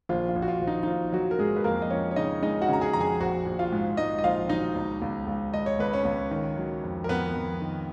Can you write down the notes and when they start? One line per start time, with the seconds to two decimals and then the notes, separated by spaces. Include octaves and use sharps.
0.09 A#1 F4
0.29 F4
0.36 A#1
0.42 F#4
0.48 F4
0.61 A#1
0.67 D#4
0.83 D#4
0.87 A#1 F4
1.13 F#3 F#4
1.31 A#4
1.39 G#2 G#3 G#4
1.56 B4
1.64 F2 A#3 A#4
1.82 D#5
1.90 F3 C#4 C#5
2.11 C#5
2.16 C#3 D#4 D#5
2.42 G#3 D#4 D#5
2.61 F#4 F#5
2.68 C#3 A#5
2.81 G#4 G#5
2.93 F2 A#5
3.00 G#4 G#5
3.20 A#1 F#4 F#5
3.46 A#1
3.59 F4 F5
3.72 G#2
3.97 G#2 D#4 D#5
4.18 D#5
4.24 A#1 F4 F5
4.49 F#3 D#4 D#5
4.75 C#2
5.02 C#2
5.27 C#2
5.54 C#2 D#5
5.66 C#5
5.79 C#2 B4
5.93 C#4 C#5
6.05 C#2
6.31 D#3
6.57 F#3
6.83 F2
7.04 A#4
7.09 F2 B3 B4
7.35 F2
7.61 D#3